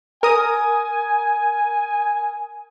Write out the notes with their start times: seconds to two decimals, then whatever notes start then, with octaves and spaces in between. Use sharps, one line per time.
0.23 A#4 G#5 D#6